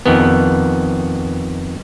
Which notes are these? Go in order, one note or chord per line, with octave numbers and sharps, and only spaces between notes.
F2 D#3 B3